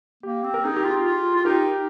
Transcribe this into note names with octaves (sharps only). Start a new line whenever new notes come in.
A#3 G4
C4
A#4
D#4 G#4
G4
F4 G#4
F4
F4
D#4 G4 A#4